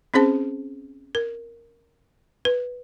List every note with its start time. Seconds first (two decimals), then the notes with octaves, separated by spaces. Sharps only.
0.14 C4 C#4 G#4 C5 A5
1.15 A#4
2.45 B4